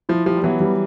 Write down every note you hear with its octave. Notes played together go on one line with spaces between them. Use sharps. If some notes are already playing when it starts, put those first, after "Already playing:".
F3 E4
F3 G4
G3
E3 F#3 B3
G3